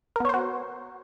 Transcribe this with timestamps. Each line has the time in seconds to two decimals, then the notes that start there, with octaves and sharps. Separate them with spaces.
0.16 A#4
0.20 B3
0.25 C#5
0.29 C5
0.34 F#4